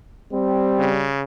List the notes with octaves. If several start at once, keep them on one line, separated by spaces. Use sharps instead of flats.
G3 C4
C#3